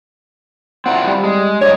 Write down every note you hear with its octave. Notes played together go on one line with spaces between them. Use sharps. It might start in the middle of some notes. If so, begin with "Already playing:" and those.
C4 E4 F4 F#5
G3
G#3
G2 C#5 D#5